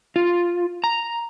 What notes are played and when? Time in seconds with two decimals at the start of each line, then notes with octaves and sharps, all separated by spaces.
0.16 F4
0.84 A#5